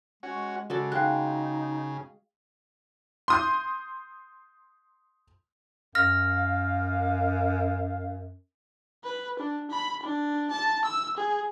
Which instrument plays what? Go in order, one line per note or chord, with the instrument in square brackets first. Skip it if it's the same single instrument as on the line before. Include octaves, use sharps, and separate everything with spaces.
[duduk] G#3 [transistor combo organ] C#4 F#4
[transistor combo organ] C#3 [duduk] G#3 [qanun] F#4 A4 D5
[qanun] G#3 [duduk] D#4 [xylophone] F5 G5 F#6
[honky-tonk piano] C6 D#6 G6
[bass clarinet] F#2 [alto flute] F5 [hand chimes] F6 A#6
[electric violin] B4
D4
B5
D4
A5
E6
G#4